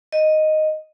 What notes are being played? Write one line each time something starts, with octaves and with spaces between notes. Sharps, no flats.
D#5